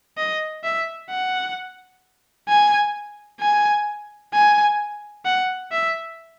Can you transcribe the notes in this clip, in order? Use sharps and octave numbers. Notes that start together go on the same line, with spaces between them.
D#5
E5
F#5
G#5
G#5
G#5
F#5
E5